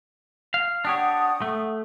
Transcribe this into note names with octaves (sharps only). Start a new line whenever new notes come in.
F5
D4 G4 C#5 F#5 D#6
A3